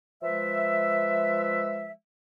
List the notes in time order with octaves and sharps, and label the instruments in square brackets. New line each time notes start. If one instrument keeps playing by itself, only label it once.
[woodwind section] F3 G#3 B4 E5